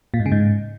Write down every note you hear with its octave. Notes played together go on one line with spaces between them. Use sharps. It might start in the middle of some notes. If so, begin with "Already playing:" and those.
A#2
G#2
C#3
G#2